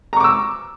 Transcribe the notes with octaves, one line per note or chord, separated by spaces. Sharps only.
A#5 C#6 D6 E6